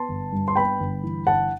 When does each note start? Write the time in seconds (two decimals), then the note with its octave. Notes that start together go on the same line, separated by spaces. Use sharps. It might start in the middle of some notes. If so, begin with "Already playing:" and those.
Already playing: B3 A5 C6
0.09 G1
0.32 G2
0.48 C6
0.56 B3 G5 B5
0.80 G1
1.03 E3
1.27 G1 F#5 A5